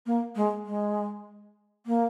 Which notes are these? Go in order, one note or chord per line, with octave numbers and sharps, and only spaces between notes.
A#3
G#3
G#3
A#3